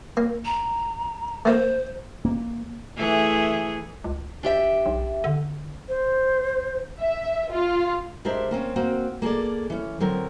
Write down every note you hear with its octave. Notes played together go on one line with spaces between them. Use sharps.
A#3
A#5
A3 A#3 C5
A#3
E3 A3 G#4
C#2
D4 G4 E5
B1
D3
C5
E5
F4
G#3 D4 G4 A#4 C5 E5
A#3 C4 C#4
A#3 C4 F#4
A#3 G#4 A4 D5
E3 C#4
D3 F#3 C4 A#4